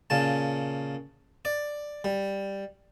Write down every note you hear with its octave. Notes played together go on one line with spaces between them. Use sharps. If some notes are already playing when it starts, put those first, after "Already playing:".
A#2 C#3 A5
D5
G3